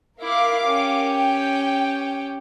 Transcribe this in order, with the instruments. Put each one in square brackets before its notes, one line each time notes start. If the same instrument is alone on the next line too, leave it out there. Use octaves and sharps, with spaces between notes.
[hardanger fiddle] E4 [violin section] A#4 F5 D6
[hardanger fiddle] C#4 G4
[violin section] G5